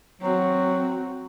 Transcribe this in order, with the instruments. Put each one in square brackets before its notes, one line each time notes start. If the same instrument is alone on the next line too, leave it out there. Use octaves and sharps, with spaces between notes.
[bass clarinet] F#3 [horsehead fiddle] C4 F#4